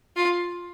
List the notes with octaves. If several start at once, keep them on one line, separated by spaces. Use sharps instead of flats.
F4